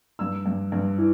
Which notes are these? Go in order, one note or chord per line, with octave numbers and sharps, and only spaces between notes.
G2 E6
G2
G2
E3